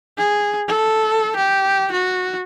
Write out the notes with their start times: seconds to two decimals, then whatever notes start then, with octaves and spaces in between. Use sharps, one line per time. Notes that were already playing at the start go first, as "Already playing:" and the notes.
0.18 G#4
0.68 A4
1.36 G4
1.92 F#4